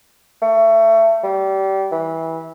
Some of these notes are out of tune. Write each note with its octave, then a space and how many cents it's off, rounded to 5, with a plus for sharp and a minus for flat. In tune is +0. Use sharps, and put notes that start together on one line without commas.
A3 +25
G3 -25
E3 -20